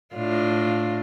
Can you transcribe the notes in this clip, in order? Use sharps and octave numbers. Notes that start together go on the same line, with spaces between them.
A2 D4 F4